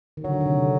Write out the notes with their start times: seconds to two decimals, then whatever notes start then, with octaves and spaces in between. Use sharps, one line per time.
0.17 D#3
0.24 D3 F#3
0.41 D3
0.46 C3